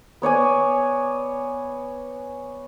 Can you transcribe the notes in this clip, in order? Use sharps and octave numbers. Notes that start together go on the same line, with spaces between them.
B3 C#5 D5 G#5